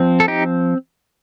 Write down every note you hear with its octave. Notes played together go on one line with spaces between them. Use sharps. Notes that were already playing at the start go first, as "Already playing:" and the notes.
Already playing: F3 C4
A4
D#4 G4